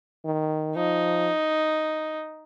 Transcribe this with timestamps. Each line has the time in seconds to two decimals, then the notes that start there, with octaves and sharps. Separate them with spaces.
0.24 D#3
0.76 F3 D#4